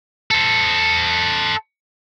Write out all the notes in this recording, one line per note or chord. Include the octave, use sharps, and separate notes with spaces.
A4 C5